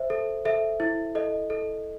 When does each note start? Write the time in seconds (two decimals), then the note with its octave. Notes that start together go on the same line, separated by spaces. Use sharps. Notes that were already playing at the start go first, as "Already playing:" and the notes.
Already playing: C5 E5
0.10 A4
0.45 A4 E5
0.80 E4
1.15 A4 D#5
1.50 A4